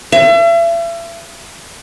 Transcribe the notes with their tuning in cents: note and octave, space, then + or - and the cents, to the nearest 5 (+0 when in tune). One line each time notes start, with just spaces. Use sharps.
E5 +40